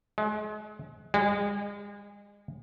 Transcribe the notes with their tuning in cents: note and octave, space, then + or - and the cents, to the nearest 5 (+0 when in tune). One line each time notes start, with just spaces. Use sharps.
G#3 +35
G#3 -35